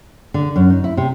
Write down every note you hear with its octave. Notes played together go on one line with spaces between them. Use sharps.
D3
F#2
D#4
E4
C3